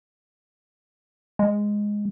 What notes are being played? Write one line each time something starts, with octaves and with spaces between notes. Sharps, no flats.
G#3